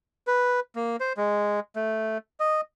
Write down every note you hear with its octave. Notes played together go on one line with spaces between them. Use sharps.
B4
A#3
C5
G#3
A3
D#5